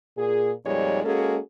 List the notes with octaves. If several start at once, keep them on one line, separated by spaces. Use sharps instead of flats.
A#2 G#4
F2 A#2 G3 G#3 D#4 C#5
G#3 A#3 C#4 F#4 G#4 A4